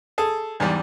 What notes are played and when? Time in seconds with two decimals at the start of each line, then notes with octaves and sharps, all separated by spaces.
0.18 G#4 A4
0.60 E2 G#2 G3